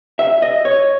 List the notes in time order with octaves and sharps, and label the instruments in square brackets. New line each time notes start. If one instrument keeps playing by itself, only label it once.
[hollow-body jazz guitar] E5
D#5
C#5